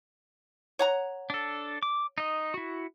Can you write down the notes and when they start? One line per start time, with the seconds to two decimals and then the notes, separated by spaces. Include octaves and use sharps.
0.79 C#5 F#5 A#5
1.30 D4 A4
1.83 D6
2.18 D#4 D#5
2.54 E4 F#4